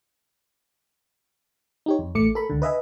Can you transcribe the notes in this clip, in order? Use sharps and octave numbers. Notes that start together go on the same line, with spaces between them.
D#4 G4 C#5
F2
A1 A3 D6 C#7
A4 A#4 B5
C#2 D3
B4 D#5 E5 G#5